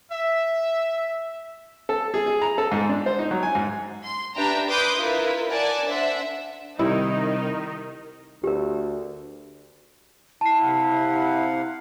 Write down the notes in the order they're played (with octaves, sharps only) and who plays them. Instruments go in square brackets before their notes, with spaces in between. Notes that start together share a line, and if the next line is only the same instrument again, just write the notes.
[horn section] E5
[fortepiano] A4
G#4
G#4
A#5
A4
G#2
D4
C5
D#4
F#3
G#5
G#2
[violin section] C6
D4 G4 B4 E5 G5 A#5
B4 C6 D6 D#6 G6
E4 F4 A#4 B4
A#4 D5 F#5 G#5 A5
D4 C5 E5 F#5
[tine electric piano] C3 G3 C4 [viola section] D#3 D#4 [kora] E4
[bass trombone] D2 [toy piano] G4 A#4
[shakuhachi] E4 [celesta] A5 C7
[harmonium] C3 F5 F#5